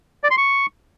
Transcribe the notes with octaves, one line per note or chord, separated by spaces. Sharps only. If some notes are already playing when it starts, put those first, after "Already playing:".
D5
C6
C#6